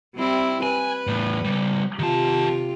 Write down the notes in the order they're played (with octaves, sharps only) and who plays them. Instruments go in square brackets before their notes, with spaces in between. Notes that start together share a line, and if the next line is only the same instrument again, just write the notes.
[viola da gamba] G3 C4 E4
[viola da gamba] B4 [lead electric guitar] G#5
[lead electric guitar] E2 A2
C#3 G3
[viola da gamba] C3 F4 G4 [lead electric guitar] D#3 A5